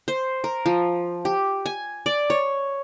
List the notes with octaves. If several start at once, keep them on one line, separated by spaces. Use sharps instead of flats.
C5
A#4
F3
G4
G#5
D5
C#5